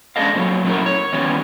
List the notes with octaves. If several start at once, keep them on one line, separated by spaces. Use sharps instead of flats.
G#3 C#4 D4 A4 D#5 F5
A#2 F#3 C#5
F#3 A3 C#4 E4 A#4
C#5
D#3 E3 G3 B3 C#4